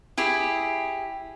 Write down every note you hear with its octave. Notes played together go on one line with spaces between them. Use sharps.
E4 G4 G#4